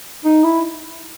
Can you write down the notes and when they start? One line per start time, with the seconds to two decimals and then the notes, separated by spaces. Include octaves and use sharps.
0.24 D#4
0.44 E4